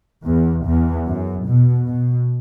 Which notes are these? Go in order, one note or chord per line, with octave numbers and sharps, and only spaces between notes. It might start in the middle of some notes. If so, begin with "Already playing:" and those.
E2
E2
F#2
B2
B2